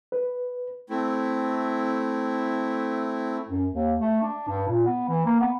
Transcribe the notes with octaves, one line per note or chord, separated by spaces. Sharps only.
B4
A3 C4 E4
F#2
D#2
A3
D4
G2
A#2
B3
E3
A#3
B3